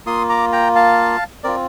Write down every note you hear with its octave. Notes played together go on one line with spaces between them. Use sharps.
A#3 F4 C6 D#6
A#5 D6
G5 A#5
F5 A5
C4 F4 A#4 D5